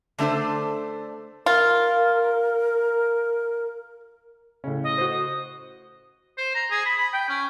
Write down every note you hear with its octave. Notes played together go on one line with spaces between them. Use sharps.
D3 A3 D4 A4 C5
F4 A#4
A2 C#3 C#4
D#5
F#4 C5
D#6
C5
A#5
G#4
B5
B5
G5
C#4